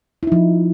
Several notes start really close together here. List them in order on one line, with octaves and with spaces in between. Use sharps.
E4 D#4 F3